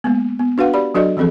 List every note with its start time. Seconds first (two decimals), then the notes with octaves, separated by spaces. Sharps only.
0.04 G#3 A#3 B3
0.39 B3
0.58 D4 F#4 B4 F5 F#5
0.74 G4 D5 B5
0.95 F#3 D4 F#4 A4 D5 D#5
1.17 E3 F3 C4 G#4 A4